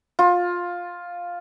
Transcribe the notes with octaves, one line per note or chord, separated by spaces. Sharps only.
F4